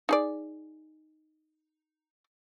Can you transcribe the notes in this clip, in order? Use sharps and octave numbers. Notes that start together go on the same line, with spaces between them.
D#4 G#4 D5